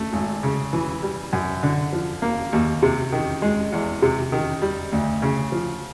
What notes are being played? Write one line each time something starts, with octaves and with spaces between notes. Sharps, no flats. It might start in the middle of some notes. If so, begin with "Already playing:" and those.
Already playing: A3
G#1
C#3
E3
G3
F#2
D3
F3
A#3
D#2
C3
D#3
G#3
E2
C3
D#3
G3
D2
C#3
F3